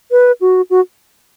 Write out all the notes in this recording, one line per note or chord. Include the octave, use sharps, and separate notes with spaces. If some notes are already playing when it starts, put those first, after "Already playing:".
B4
F#4
F#4